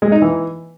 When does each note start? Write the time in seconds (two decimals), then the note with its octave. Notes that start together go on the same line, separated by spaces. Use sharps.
0.02 G#3
0.12 D#4
0.22 E3